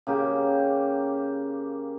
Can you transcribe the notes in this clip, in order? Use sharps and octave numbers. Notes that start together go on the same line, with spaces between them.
C#3 A#3 G4